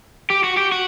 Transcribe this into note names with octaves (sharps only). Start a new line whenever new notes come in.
G4
F#4
G4
F#4